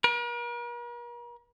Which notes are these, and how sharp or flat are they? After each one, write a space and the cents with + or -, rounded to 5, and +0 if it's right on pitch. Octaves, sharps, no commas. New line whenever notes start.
A#4 +45